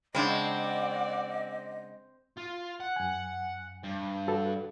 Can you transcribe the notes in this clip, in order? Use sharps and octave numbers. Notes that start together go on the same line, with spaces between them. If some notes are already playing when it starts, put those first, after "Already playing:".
C#3 G#3 C4 D4 D5 D#5 F#5
F4
F#5
F#2 G#5
G2
F#4 A4 B4